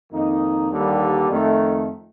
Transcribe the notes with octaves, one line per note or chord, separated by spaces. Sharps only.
F2 D#3 A#3 D#4
D#2 D3 G3 A#3
F2 D#3 A3